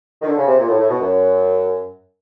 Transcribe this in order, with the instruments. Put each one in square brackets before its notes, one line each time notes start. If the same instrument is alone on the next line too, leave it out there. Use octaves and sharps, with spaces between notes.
[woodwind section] D#3
D3
C#3
C3
A#2
A2
A2
B2
F#2